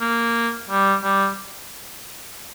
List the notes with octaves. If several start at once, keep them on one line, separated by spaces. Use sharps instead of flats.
A#3
G3
G3